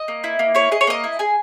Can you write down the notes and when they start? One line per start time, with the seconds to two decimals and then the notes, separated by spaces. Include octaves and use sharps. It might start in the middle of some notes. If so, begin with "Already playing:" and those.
Already playing: D#5
0.08 A#3
0.24 E4
0.39 A#3
0.55 E4 C#5
0.72 G#4 D#5
0.81 C#5
0.87 A#3 D#5
1.04 E4
1.19 G#4 G#5